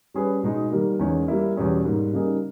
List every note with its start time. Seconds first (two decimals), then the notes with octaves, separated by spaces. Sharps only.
0.14 G3 C#4 G#4 B4
0.43 B2 G#3 D#4
0.71 D#3 G3 A#3
0.99 E2 D#3 G#3 C#4
1.28 G3 A#3 E4
1.56 E2 B2 G3 C#4 G#4
1.84 G#2 G3 A#3
2.13 C#3 G3 A#3 D#4 G#4